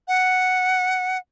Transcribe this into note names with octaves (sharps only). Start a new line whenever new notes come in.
F#5